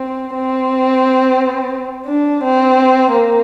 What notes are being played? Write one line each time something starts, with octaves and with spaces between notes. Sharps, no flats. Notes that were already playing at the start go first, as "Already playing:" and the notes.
Already playing: C4
C4
D4
C4
A#3